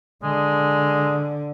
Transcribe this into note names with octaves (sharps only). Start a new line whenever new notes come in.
D3 G#3